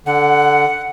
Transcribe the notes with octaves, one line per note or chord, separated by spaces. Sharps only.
D3 F#5